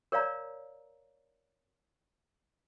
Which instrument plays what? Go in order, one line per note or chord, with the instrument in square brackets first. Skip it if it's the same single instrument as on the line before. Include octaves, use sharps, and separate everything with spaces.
[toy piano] A#4 C#5 D5 F5 A#5